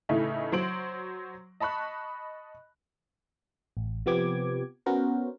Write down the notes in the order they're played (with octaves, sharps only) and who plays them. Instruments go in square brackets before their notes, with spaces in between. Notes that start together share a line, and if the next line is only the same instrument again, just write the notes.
[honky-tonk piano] A2 C#3 E3 A3 D#4 A4
F#3 C5 C6 D7 F#7
D#5 A5 B5 C#6 F#6
[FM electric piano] A1
C3 F3 B3 G4 D6 G#6
B3 C#4 F#4 A#4 C5